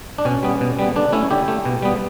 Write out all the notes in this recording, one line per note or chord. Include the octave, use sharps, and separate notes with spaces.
D4
B2 C#4
G3 B3
B2
G3 B3
D3 D4
A3 C#4 E4
D3 E4 G4
A3
B2
G3 B3